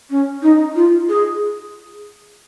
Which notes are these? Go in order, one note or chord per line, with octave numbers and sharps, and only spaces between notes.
C#4
D#4
F4
G#4